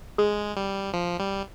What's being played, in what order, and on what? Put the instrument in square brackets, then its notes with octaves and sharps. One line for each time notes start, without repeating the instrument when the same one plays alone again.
[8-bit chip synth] G#3 [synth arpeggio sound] G#4
[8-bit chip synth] G3
F3
G3